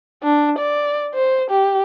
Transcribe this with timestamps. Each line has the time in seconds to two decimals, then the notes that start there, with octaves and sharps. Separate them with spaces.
0.23 D4
0.59 D5
1.15 C5
1.50 G4